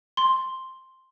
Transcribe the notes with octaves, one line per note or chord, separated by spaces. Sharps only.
C6